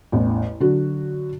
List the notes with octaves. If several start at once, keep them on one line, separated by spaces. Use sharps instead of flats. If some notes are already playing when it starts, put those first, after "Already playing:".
A1 E2
D3 F#3 F#4